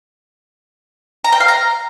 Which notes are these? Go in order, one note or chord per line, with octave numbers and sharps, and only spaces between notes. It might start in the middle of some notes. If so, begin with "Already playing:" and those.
A#5
G5
F5
A#5